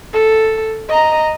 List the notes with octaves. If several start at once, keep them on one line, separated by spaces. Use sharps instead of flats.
A4
D#5 A#5